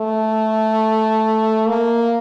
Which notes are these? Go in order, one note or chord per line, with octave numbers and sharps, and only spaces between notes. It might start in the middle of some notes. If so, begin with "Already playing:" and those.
Already playing: A3
A#3